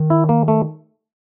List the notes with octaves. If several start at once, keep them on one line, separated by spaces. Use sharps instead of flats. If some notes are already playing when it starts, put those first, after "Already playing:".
Already playing: D#3
E4
A#3
A3